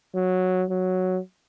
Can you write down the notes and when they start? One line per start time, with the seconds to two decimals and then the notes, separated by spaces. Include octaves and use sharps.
0.15 F#3
0.70 F#3